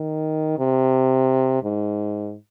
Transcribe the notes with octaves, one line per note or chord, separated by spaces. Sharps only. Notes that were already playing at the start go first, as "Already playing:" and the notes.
Already playing: D#3
C3
G#2